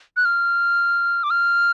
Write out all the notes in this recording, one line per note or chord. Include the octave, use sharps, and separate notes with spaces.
F#6
F6
D6
F6